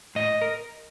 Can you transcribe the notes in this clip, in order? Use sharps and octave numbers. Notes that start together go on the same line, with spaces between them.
A2 D#5
A#4